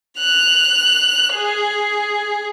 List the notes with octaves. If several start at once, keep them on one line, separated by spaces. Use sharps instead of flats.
F#6 F7
G#4